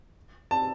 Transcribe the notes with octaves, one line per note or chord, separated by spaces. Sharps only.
A5